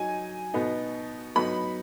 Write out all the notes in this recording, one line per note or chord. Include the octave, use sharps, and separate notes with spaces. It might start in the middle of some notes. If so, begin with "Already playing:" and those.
Already playing: F#3 D#4 G#5
B2 B3 D#4
F#3 B3 D#4 B5